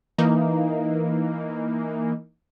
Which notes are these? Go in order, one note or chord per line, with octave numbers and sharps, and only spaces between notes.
E3 A#3 D#4